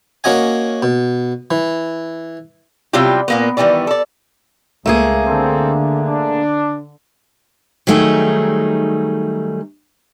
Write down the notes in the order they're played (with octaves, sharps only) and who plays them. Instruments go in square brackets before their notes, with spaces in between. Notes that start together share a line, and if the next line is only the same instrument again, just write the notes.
[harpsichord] A#3 C#4 F#4 D#5 G#5
B2
E3
[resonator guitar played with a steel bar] C3 F#3 G3 E4 F4 G4
A#2 A#3 B3
D#3 E3 G3 B3 D5
A4 D5
[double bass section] C#2 [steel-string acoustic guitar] A3 A#3 G#4
[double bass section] D3 [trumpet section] C4 A4
[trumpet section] D4
[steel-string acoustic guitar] D#3 F#3 G3 A3 D#4 G#4